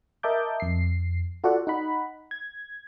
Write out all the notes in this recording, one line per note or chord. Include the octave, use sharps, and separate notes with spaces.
A#4 D#5 E5 A5 D6 G6
F2 C7
F4 F#4 A4 D5 F#5
D#4 F#5 B5
G#6